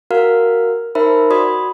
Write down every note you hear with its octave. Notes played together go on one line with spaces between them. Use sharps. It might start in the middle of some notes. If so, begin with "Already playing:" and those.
F#4 A#4 F5 F6
D#4 A#4 C5 E5 B5
F#4 D5 B5 C6 D#6